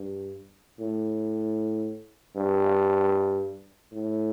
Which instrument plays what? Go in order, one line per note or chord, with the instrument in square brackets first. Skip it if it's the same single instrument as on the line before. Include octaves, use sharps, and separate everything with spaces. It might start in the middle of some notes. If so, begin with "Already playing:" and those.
Already playing: [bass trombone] G2
A2
G2
A2